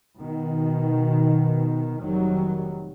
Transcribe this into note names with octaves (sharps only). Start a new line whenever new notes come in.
B2 D#3
F1 D#3 F#3 G3